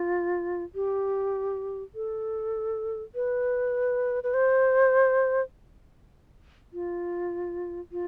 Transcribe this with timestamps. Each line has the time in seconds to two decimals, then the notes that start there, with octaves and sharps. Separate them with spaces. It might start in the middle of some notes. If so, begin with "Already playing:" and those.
Already playing: F4
0.75 G4
1.95 A4
3.15 B4
4.23 B4
4.34 C5
6.73 F4
7.92 F4